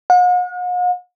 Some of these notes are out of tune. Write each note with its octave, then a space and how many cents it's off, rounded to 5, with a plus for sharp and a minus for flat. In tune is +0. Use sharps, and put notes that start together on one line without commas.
F#5 -45